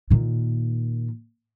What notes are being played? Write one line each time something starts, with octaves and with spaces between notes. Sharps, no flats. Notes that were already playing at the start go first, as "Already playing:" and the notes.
A#2 D#3